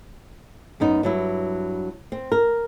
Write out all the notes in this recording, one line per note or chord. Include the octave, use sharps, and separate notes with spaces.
F#2 B3 D#4
G2 F#3 E4
C4
A#4